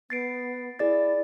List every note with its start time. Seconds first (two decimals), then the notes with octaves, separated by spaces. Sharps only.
0.10 B3 A6 C7 D7
0.79 E4 G#4 D5 A6